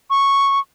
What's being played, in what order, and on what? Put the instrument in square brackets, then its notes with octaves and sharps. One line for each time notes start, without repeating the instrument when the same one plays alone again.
[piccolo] C#6